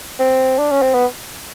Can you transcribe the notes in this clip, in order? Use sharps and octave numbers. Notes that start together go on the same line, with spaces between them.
C4
D4
C#4
C4
B3